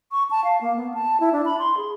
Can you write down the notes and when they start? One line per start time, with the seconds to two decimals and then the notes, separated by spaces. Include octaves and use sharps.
0.12 C#6
0.31 A5
0.44 F5
0.61 A#3
0.76 B3
0.94 A5
1.20 E4
1.33 D4
1.45 B5
1.59 C6
1.77 G#4